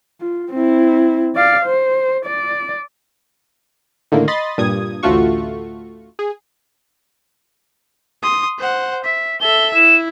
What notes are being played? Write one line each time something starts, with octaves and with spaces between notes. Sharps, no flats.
F4
C4 E4
D5 F5
C5
D5
A2 D3 D#3 A#3
D#5 B5 C6 D#6 A6
G2 A#2 D#6 G#6
A1 D2 A3 F4 F#4 C#6
G#4
C6 D#6
C5 F#5
E5 B6
A4 E5 G7
E4 E7